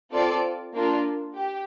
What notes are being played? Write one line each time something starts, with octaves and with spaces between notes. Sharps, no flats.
C4 F4 A4 D5
A#3 D4 F4
G4